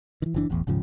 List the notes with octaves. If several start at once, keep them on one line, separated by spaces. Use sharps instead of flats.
D#3 E3
F#1 E3 D4
E1 A1 E2
D#1 G#2 C#3 F3